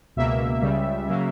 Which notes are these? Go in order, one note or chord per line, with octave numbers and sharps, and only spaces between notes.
C#2 B2 A#3 E5
C#2 C#3 G3
C#3 F#3 A#3